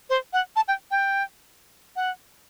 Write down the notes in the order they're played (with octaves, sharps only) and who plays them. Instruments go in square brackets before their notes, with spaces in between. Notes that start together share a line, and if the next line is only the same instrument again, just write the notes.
[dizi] C5
F#5
A5
G5
G5
F#5